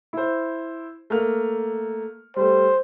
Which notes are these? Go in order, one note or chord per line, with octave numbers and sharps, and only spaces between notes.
E4 C5
A3 A#3 F6
G3 A3 C5